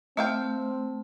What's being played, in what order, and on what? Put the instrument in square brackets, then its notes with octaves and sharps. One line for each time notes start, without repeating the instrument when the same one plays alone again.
[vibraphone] A3 [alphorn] C4 [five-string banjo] E5 F5 G5